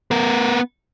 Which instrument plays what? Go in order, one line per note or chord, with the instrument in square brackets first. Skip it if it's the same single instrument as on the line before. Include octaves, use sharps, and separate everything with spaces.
[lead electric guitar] B3 A#4